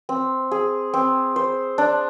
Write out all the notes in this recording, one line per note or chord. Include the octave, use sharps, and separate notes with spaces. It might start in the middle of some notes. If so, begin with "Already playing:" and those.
C4
G#4
C4
C5
D4